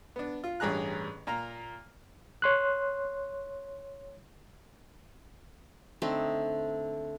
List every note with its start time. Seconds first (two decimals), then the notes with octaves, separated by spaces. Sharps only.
0.16 B3 D4
0.44 F4
0.60 A1 G2 D4 G#4 A#5 F#6
1.27 A#2 A#3 A#5
2.42 C#5 C6 F#6
6.02 D3 A3 C4 D#4